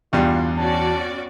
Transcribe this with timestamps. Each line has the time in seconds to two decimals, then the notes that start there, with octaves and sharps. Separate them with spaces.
0.13 E2 G2 B2 G3 F4
0.58 C#4 F#4 D5 A5